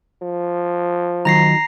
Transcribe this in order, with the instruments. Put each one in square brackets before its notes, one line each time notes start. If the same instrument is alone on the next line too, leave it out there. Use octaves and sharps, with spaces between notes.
[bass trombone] F3
[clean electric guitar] D#3 F#3 [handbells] A#5 A#6 C7